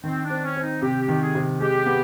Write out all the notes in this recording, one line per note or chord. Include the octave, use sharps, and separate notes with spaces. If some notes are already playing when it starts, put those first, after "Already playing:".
D#3 C4
D4
C4
C#4
C4
D#4
C3 G4
G4
D#3
G#4
C3
G#3 G4
B3